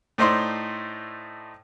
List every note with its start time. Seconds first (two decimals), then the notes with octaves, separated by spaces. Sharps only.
0.18 A2 A3 D#4 C5 D5 C6